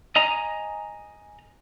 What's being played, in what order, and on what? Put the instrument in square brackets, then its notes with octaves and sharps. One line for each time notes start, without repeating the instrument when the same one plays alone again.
[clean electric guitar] D#5 G#5 A#5